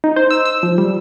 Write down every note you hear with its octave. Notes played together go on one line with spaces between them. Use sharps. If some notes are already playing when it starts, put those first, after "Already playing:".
D#4
C5
E6
E6
F3
G3